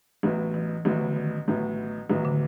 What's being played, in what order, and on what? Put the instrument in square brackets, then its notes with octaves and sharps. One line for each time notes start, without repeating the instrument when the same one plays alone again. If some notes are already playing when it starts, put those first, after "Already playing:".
[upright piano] A1 A2 F#3 B3 [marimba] E3
[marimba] E3
[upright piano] A1 A2 F#3 B3 [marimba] D#3
[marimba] D3
D#3
[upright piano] A1 A2 F#3 B3
[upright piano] A1 A2 F#3 B3 [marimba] D#3
[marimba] D3